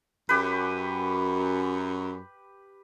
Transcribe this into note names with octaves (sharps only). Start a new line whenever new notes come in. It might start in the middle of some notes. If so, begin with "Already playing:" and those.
F#2 G4 B4